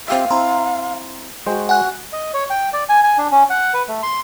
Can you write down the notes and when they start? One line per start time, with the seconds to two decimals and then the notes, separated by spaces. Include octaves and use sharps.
0.08 C4 G4 E5 F5
0.30 C4 E4 A#5 C6
1.47 G#3 F#4 C5 G5
1.69 F#5 G#5 F#6
2.13 D#5
2.34 C#5
2.50 G5
2.73 D5
2.89 G#5
3.03 G#5
3.18 D4
3.31 C#4
3.50 F#5
3.74 B4
3.88 A3
4.03 C6